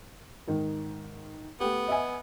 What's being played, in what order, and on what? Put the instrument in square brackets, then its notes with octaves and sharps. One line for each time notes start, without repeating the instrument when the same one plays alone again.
[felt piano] G#2 D#3
[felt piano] A3 G4 [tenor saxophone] B3
[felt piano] D#5 E5 G#5